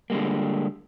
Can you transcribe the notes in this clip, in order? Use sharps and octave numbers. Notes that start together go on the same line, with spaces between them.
D3 G3 G#3 A#3